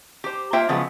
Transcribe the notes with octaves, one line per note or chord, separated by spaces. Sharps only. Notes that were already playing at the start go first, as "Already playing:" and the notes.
G4 C5
A#3 F4 C5 E5 G5
C#3 F3 F#3 G#3 B3